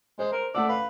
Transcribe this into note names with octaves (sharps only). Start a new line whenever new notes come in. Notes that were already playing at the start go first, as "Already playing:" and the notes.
G#3 C5
A#4
A3 D5 F#5 E6
B4 F5